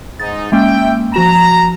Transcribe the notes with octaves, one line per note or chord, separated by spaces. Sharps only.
G#2 D#4 A6
G#3 A#3 C#4 E5 G5
F3 F#4 A#5 E7